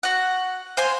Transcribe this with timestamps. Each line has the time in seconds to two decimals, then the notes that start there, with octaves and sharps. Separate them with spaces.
0.03 F#4 F#5
0.77 C5 F5 G#5 C6